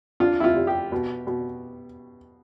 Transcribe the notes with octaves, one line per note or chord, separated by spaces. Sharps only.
D4 F4
E4
F4
C3
G4
B2
B2